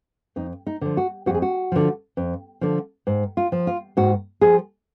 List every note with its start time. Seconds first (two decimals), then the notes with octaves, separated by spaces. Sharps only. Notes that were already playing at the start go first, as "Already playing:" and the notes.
0.36 F2 D#4
0.67 D#4
0.81 D3 F3
0.97 F#4
1.26 F2 F#4
1.34 G#4
1.42 F#4
1.72 D3 F3
2.17 F2
2.61 D3 F3
3.07 G#2
3.37 F4
3.52 F3
3.67 F4
3.97 G#2 F#4
4.41 F3 G#4